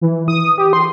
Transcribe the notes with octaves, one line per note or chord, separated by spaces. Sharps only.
E3
D#6
G4
C6